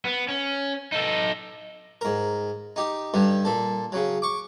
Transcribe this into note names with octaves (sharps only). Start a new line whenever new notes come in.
B3
C#4
D#4 A4
G#2 A#4
D#4 G4
G2 D3 G3
A#2 A4
C#3 F#3
C#6 D6